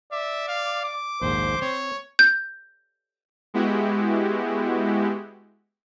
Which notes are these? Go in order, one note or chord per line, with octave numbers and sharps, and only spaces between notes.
D5 E5
F5
D6
A#1 D#2 G#2 C5
C4 C#5
G6
G#3 B3 E4 F#4 G4